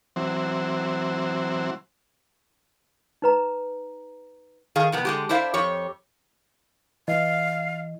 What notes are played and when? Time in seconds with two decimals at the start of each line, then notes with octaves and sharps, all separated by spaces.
0.16 E3 F#3 C4
3.22 D#4 B4 A#5
4.76 D#3 G#4 F5
4.92 F2 C3 B3
5.05 D3 G#3 G4
5.29 D4 E4 C5 E5 F5
5.54 F2 G4 C#5
7.08 E3 D#5 F5